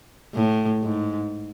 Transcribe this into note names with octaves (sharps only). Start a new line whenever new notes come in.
A2
G#2